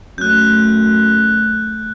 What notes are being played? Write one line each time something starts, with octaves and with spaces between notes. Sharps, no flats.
F#2 A3 F#6 G6